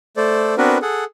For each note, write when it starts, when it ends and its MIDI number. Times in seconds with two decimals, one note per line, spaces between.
0.17 0.55 57
0.17 0.55 69
0.17 0.55 72
0.17 0.55 74
0.58 0.78 59
0.58 0.78 60
0.58 0.78 62
0.58 0.78 66
0.58 0.78 70
0.58 0.78 71
0.82 1.04 68
0.82 1.04 69
0.82 1.04 78